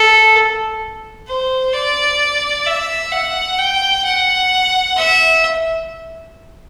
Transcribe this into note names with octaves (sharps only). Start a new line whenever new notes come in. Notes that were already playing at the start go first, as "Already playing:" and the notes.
Already playing: A4
C5
D5
E5
F#5
G5
F#5
E5